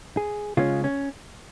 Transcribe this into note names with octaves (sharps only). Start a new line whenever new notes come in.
G#4
C#3 G#3 C#4 F4
C#4